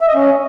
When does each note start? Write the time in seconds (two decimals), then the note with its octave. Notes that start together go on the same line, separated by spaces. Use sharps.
0.01 E5
0.08 D#5
0.15 C#4